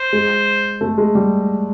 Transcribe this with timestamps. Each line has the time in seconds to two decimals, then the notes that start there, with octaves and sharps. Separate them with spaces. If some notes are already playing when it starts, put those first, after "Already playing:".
Already playing: C5
0.13 G#3
0.81 A3
0.98 G#3
1.15 G3